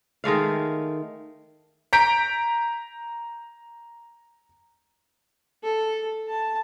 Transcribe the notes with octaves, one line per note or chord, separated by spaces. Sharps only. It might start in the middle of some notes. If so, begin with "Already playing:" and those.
D#3 G#3 A3 F5
A#5 G6 B6 D7
A4
A5